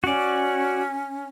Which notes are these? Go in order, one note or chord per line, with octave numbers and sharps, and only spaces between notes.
C#4 F#4 D5